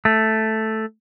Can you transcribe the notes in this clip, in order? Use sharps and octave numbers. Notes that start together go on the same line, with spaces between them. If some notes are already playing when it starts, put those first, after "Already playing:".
A3